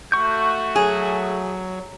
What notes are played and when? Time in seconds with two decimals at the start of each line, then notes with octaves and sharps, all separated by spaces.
0.12 A3 F#4 C#6 G6
0.76 F#3 G#4